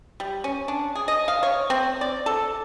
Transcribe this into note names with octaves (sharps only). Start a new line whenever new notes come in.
G3
C#4
D4
G#4
D#5
F5
C#5
C4
D5
A4